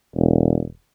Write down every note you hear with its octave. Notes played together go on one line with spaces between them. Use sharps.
E1